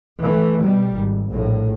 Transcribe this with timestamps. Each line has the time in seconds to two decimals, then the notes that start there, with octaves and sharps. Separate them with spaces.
0.21 E3 A3
0.60 B2 G3
0.94 G#1
1.32 A#1 A2